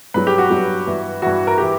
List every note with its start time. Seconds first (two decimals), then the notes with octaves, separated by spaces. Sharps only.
0.14 G2 F#3 B4
0.27 G4
0.38 F#4
0.50 G2 F#3
0.87 G2 E3
1.22 G2 E3 F#4
1.47 A#4
1.58 E3 G4